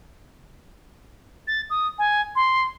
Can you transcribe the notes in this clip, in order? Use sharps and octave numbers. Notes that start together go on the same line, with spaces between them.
A6
D#6
G#5
C6